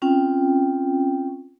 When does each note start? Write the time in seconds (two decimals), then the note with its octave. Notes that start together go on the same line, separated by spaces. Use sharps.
0.02 C4 C#4 F4 G5